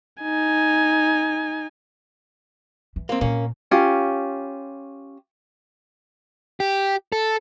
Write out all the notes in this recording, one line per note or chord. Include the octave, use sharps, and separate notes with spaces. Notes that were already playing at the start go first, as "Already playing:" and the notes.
D#4 G#5
E3
A#3 C4
A#2 A#3 C4 C#4
C#4 F4 G4
G4
A4